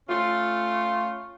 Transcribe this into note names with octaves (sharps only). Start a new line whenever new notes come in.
A3 C#4 F4